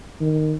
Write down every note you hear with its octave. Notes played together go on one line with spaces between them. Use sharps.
D#3